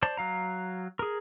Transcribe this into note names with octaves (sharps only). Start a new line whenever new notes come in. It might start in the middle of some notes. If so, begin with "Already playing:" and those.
C5 D5 A5
F#3 F5 A#5
G#4 A#4